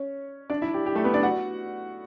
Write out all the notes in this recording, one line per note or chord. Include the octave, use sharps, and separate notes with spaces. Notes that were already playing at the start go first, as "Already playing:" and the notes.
Already playing: C#4 C#5
D4 D5
E4 E5
G4
G4
A3 A4
B3 B4
D4 D5
F#4 F#5